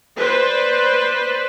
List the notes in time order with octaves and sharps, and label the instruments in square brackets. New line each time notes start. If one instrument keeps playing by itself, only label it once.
[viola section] B4 C5 D5